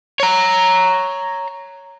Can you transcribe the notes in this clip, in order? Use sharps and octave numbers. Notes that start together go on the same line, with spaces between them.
C#5 A#5